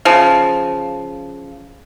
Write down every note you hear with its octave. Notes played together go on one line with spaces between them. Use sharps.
C#3 F3